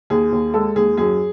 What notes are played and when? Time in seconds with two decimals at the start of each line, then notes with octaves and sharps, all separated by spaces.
0.10 D#2 G#4
0.32 D#2
0.54 G#3 A4
0.76 D#2 G#4
0.97 F#2 G#4